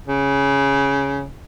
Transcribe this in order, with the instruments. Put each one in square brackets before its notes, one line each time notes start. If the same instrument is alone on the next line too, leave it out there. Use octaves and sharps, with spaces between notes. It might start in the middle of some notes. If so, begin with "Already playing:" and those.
[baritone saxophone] C#3